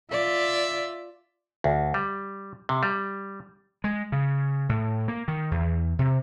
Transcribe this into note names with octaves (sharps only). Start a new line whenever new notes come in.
F4 D5 E5
D2
G3
C3
G3
G#3
C#3
A2
A#3
D#3
E2
C3